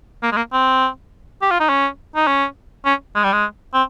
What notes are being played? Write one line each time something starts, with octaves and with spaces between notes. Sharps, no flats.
A#3
G#3
A#3
C4
G4
F4
D#4
C#4
D#4
C#4
C#4
G#3
G3
G#3
C4